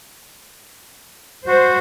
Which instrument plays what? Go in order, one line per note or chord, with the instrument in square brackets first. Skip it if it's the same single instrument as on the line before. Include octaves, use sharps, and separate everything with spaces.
[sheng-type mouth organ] F#4 [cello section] C5